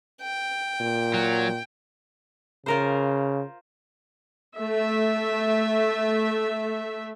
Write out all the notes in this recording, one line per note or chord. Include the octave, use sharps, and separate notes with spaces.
G5
A#2
F#3
C#3 F4 A#4 C5
A3 E5